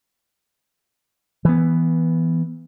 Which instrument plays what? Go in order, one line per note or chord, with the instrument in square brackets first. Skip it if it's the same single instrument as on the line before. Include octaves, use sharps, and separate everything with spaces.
[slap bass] E3 B3